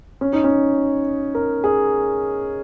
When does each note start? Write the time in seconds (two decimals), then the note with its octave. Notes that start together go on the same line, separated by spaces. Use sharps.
0.21 C#4
0.33 D#4
0.44 C#4
1.35 A#4
1.64 G#4